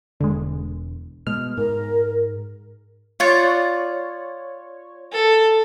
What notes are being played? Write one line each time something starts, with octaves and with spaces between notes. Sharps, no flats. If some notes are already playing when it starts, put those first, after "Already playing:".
E1 D3 G#3
B2 G#3 F6
G#2 A#4
F4 C#5 D5 F#5
A4